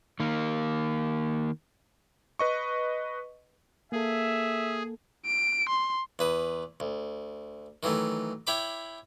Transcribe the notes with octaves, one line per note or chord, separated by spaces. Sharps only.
D#3 A#3
B4 D#5 C#6
A#3 G#4 A4 E5
D7
C6
E2 B4 D#6
D2
D#3 E3 F#3 A3
E4 C#5 G5 B5 D6